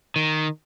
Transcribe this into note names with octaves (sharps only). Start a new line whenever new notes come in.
D#3